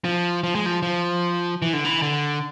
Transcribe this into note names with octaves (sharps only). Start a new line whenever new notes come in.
F3
F3
G#3
F3
F3
E3
D3
E3
D3